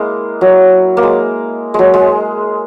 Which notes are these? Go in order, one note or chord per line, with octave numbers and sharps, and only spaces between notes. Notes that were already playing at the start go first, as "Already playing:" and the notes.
Already playing: G#3 A#3 E4
F#3
A#3
G#3
F#3 G#3
G#3